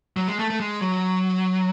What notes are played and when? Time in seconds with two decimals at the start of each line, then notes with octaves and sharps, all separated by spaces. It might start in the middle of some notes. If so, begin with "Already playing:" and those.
0.17 F#3
0.28 G#3
0.39 A3
0.50 A3
0.60 G#3
0.81 F#3